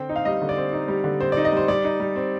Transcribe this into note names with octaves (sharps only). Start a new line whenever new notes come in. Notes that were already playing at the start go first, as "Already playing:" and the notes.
Already playing: D3 C4 G5
D#4
F5
G3 D#5
D3
D5
C4
D#4
G3
D3
C4 C5
D#4 D5
D#5
G3 C5
G3 D5
D#4
G3
C4